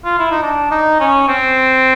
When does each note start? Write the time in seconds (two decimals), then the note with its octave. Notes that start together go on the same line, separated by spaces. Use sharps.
0.05 F4
0.18 E4
0.31 D#4
0.42 D4
0.71 D#4
1.00 C#4
1.28 C4